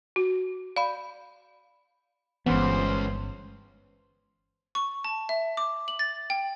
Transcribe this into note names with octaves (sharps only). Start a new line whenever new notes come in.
F#4
D5 F5 B5
G1 E3 G#3 B3 C#4 C5
C#6
A5
E5
D6
F#7
A6
G5